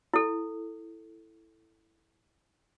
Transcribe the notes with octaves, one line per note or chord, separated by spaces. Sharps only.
E4 A4